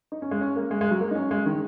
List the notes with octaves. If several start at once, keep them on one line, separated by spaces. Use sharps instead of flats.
D#4
C#4
G#3
C#4
A#3
G#3
G#3
F#3
A#3
D#4
C#4
G#3
D#3